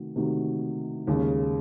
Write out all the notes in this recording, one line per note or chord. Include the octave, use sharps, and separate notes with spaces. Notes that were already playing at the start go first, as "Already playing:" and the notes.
Already playing: C3 D#3 A3 F#4
C3 D#3 A3 D#4 F#4
D#2 C#3 G#3 C#4